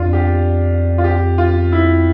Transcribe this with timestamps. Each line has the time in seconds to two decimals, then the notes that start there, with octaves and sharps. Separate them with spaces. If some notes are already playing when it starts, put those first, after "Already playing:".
Already playing: F2 D4 F4
0.13 G4
0.98 F4
1.04 G4
1.38 F4
1.72 E4